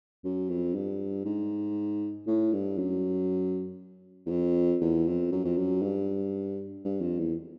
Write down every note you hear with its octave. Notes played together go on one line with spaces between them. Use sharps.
F#2
F2
G2
G#2
A2
G2
F#2
E2
F2
E2
F2
F#2
F2
F#2
G2
G2
F2
E2